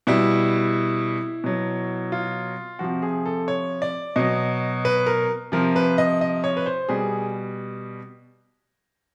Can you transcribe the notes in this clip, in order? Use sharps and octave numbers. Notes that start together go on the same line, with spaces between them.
B2 G3 E4
B2 F#3
F4
C3 F3 F#4
G#4
A4
C#5
D5
B2 F#3 D#5
B4
A#4
C3 F3 A#4
B4
D#5
D#5
C#5
B4
C5
B2 G3 G#4